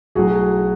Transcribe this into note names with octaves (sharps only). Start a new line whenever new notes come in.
B1 A2 F#3 F#4 G#4